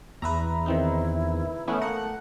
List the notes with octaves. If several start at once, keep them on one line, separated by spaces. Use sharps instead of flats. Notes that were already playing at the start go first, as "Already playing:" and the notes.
E2 B4 E5 A#5
D#3 C4 D#4 E4
E3 A3 B3 C#4 E4
A#3 F#5 A#5